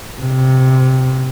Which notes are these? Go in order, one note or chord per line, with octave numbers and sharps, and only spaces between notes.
C3